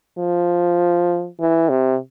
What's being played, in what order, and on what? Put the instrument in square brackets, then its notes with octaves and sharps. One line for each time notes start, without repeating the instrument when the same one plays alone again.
[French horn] F3
E3
C3